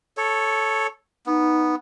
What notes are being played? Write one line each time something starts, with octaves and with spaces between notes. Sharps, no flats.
A4 C#5
B3 D#4